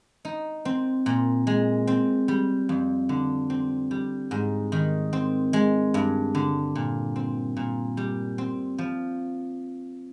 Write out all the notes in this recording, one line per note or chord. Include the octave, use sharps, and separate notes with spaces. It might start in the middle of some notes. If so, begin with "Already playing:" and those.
D#4
C4
A#2
G#3
C4
G3
F2
D3
C4
G3
G#2
D#3
C4
G#3
G2
D3
A#2
C4
A#2
G3
C4
F3